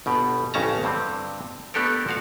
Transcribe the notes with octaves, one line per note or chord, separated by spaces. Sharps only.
G1 B2 G4
A1 F2 C#3 C#4 A5 A#5
G2 D3 C4
A3 B3 D4 G4 A4 A#4
F3 F#4 F5